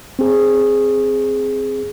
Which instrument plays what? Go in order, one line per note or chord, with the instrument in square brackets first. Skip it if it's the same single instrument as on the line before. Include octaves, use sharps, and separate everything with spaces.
[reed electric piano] C4 G#4